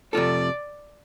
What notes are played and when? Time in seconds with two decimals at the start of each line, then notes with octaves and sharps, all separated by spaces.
0.13 F2 C3 A3 F4 A4 D5